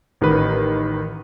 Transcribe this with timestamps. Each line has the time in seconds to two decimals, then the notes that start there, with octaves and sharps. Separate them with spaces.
0.21 A1 D#3 G4 B4